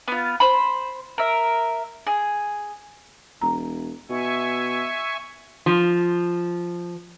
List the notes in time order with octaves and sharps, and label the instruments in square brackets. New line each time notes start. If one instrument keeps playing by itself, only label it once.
[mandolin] B3 F4
C5 B5
A#4 E5
G#4
[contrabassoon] E1 [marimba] A#5
[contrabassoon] B2 [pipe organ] E5 G#5 C#6
[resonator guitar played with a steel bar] F3